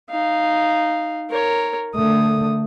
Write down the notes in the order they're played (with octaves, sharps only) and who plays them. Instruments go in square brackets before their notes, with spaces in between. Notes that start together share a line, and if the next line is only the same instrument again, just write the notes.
[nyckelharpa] D#4 F5
A#4 C#5
[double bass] D3 A3 [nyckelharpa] D#6